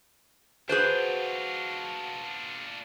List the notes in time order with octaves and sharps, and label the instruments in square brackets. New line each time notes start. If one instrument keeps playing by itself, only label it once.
[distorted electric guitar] D4 F4 [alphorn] F#4 [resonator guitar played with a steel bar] G#4 B4 C5